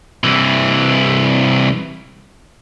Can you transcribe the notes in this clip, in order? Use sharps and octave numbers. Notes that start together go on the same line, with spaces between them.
C2 E3